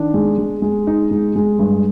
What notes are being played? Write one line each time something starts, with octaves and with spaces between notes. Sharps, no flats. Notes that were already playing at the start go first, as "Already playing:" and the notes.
Already playing: D#3 D4
G#3
G#3
G#3
D#4
G#3
G#3
G2